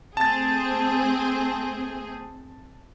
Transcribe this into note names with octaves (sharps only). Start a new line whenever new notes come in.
A3 C4 G#4 A5 A6